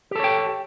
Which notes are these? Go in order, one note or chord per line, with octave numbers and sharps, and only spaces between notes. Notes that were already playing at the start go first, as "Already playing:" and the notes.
G4 A4 C#5 G5